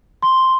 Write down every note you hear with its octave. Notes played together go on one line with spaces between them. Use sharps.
C6